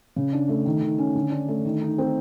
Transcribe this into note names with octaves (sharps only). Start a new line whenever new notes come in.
C#3
D4
A3
D#3
D#3
C#4
D3
D4
A3
D#3
D#4
C4